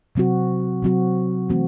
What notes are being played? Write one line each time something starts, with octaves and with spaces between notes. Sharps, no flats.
C3 F#3 C4 F#4
C3 F#3 C4 F#4
E3 A3 C4 F#4